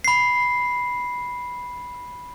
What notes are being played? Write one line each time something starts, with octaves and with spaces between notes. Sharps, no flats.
B5 C7